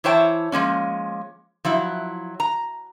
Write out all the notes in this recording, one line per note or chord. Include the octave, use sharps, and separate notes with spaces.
E3 E4 C5 C#5 G5 A5
F3 G#3 A#3 C#4
F3 F#3 E4
A#5